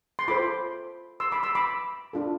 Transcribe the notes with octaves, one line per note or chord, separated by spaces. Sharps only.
C6
F4 A4 C5 B5 D6
C6 E6
B5 D6
C6 E6
B5 D6
D4 F4 A4